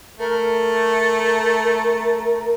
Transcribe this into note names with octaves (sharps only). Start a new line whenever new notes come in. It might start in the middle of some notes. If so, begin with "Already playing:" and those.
A3 A#4